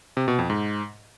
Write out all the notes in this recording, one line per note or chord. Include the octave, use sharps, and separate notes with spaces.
C3
B2
F2
G#2